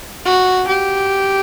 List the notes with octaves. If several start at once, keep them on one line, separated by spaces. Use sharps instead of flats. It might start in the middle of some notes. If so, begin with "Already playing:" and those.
F#4
G4